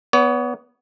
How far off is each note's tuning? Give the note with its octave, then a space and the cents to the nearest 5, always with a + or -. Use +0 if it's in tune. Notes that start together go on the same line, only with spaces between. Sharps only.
B3 +0 C#5 +40